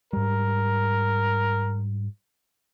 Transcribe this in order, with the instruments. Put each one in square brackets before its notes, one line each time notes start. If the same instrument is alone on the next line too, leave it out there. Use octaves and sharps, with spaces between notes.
[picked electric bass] G#2 G3 [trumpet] A#4